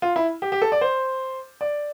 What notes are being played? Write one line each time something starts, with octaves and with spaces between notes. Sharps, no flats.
F4
E4
G4
G4
A4
D5
C5
D5